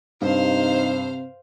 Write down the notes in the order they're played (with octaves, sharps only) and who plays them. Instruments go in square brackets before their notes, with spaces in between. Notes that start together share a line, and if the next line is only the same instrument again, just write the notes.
[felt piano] G2 [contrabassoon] C3 [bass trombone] D#4 [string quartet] C5 F5